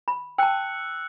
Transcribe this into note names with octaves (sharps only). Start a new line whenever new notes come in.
B5
G5 A5 E6 F#6 C#7